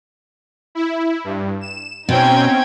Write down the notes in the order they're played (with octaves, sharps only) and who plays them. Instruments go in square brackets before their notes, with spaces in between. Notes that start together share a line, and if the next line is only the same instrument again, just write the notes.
[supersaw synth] E4
G2
E7
[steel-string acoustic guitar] B2 [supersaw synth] C4 C#4 [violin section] D#4 G5 G#6